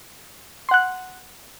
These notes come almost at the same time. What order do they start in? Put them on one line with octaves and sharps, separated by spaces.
C6 F#5 F#6